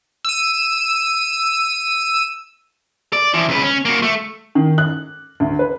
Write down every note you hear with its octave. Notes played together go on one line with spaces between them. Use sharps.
E6 D#7
D5
E3 F3
C#2 B4
C#4
A#3 F#4
A3
D#3
F#6
D2
B4